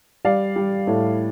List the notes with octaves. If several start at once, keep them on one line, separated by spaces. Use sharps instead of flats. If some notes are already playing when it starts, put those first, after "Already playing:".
G3 D5 F5
G3
A2